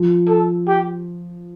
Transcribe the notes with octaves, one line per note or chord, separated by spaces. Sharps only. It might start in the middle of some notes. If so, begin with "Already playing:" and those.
Already playing: F3
A4
G4